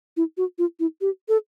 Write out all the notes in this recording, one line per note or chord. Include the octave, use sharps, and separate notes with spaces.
E4
F#4
F4
E4
G4
A4